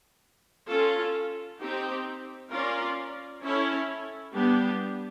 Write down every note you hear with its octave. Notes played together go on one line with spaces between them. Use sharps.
C#4 F4 A4
C4 D#4 G4
C#4 F4 A#4 D5
C#4 E4 A4 C#5
G3 B3 D4 G4